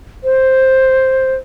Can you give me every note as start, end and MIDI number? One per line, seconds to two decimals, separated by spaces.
0.24 1.34 72